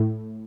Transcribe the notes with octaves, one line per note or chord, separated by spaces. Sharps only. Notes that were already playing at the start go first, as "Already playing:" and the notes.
Already playing: A2